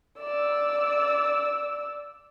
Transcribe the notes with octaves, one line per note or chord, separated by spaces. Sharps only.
D5 E6